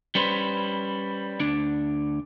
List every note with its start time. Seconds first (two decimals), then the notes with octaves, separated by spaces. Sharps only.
0.15 G3 C#4 B4 C5
1.40 D2 D4